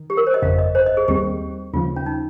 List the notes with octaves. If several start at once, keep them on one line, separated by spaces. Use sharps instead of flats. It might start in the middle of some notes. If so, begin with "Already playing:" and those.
Already playing: D#3
G4
A#4
C5
D#5
G1 F2 C#3 F5
D#5
C5
D#5
G#4
D#2 D#3 G3 C4 G4
D#2 C#3 F3 F4
C#4
D#4